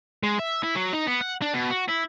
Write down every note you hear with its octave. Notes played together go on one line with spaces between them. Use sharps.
G#3
E5
E4
F#3
D#4
B3
F#5
D4
B2
F#4
E4